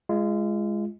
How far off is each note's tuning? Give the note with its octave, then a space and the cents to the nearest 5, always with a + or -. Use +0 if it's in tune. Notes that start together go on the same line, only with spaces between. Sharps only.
G#3 +0 F4 -35